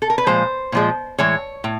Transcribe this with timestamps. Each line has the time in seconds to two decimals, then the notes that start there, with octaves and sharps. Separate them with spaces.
0.02 A4
0.10 A#4
0.18 B4
0.26 A#2 F3 G#3 C5
0.72 A#2 F3 G#3
1.18 A2 E3 G#3 C#5
1.64 A2